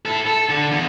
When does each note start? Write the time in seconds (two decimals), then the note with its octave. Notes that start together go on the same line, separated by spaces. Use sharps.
0.05 E4 A4
0.26 A4
0.49 D3
0.72 E2